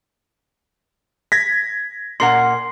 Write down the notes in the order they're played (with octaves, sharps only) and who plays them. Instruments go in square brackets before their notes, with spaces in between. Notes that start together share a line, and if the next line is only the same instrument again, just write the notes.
[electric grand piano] G#6 A#6 B6
[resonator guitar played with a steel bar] A#2 A#4 F#5 [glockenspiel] C6 C7